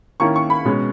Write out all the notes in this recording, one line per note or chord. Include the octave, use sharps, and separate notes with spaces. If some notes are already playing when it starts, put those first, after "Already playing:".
D#3 A#3 C#4 E4 C#6
C#6
B5
B2 G#3 C#4